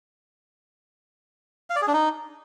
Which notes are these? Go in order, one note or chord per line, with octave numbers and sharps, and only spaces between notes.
F5
D5
G#4
D4
D#4